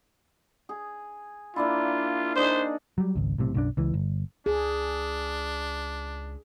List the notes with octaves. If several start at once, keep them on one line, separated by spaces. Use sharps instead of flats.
G#4
A#3 D4 E4 F4
D4 D#4 G#4 C5
F#3 G3
G#1 C#2
B1 A2 C3
B1 F#2 C#4 D4
C#2 E3
G1
C#2 D4 G#4